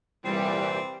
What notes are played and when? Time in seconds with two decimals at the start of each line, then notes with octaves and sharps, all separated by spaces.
0.25 C2 A#2 E3 G3 C4 G4